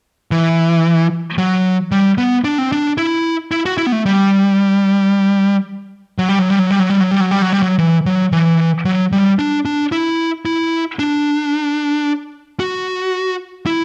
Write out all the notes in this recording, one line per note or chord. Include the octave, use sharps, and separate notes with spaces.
E3
F#3
G3
B3
D4
C4
D4
E4
E4
F#4
E4
B3
A3
G3
F#3
G3
F#3
G3
F#3
G3
F#3
G3
F#3
G3
F#3
G3
F#3
G3
F#3
E3
F#3
E3
F#3
G3
D4
D4
E4
E4
D4
F#4
E4